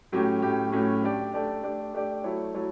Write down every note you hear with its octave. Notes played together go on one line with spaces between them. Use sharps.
A2 F#3 C#4 G4
A2 F#3 C#4 G4
A2 F#3 C#4 G4
A3 D4 G4 D5
A3 D4 G4 D5
A3 D4 G4 D5
A3 D4 G4 D5
F#3 A3 E4 A4 C#5
F#3 A3 E4 A4 C#5